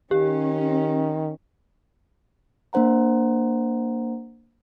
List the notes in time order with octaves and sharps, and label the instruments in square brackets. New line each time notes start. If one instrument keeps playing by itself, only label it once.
[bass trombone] D#3 [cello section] C#4 [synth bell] G4
[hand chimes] A#3 D4 C5 F#5 A#5